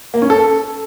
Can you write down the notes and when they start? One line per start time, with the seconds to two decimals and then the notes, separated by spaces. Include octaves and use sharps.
0.14 A#3
0.22 C#4
0.30 A4